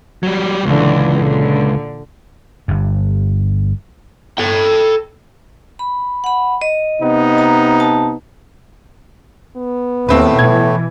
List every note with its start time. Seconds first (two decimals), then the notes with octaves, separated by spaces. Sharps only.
0.23 F#3 G3
0.65 C#2 A#2 D3 E3
1.16 A#2 D3
2.68 G1 G2
4.38 A4 G5
5.79 B5
6.24 F#5 B5
6.62 D#5
7.01 C3 B3 D#4
7.38 A#5
7.80 A5
9.56 B3
10.09 D#2 A2 A3 C4 B4
10.39 B2 E3 G#6